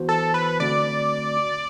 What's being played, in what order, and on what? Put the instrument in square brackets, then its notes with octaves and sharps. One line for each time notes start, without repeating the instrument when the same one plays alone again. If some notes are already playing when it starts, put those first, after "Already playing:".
Already playing: [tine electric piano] E3 B3 F#4 C5
[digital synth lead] A4
B4
[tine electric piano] D3 A3 C4 F#4 [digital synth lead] D5